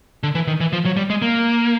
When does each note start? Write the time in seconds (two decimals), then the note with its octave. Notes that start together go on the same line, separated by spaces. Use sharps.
0.23 D3
0.35 E3
0.47 D#3
0.60 E3
0.73 F3
0.85 F#3
0.97 G3
1.10 G#3
1.22 A#3